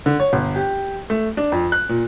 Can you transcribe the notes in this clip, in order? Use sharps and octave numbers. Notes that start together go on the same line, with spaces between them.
D3
C#5
G1
G4
A3
D4
F2
F#6
A#2